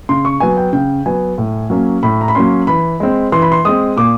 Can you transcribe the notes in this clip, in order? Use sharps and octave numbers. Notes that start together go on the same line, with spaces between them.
C#3 C6
C#6
F#3 B3 G#5
G5
C#3 G5
F#3 B3 G#5
A2
F#3 A#3 C#4
A2 B5
A#5
B5
F#3 A#3 C#4 C6
E3 B5
G#3 C4
E3 C6
B5
C6
G#3 C4 D#6
A#2 D6